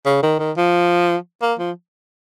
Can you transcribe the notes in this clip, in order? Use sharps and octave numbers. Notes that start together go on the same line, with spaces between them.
C#3
D#3
D#3
F3
A#3
F3